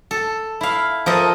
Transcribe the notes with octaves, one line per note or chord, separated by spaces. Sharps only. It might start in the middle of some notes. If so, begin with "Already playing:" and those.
A4
E4 F5
F3 A4 A#4 D#5